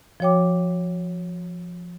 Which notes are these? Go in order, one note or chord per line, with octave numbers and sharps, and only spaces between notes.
F3 F#4 C#5 G5 D6